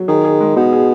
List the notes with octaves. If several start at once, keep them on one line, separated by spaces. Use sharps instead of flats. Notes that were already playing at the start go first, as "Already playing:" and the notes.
Already playing: F#3
D#3 G#4
G#4
G#3
B2 D#4
G#4